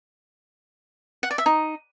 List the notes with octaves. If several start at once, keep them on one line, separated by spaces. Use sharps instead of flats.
F#5
D5
E5
D#4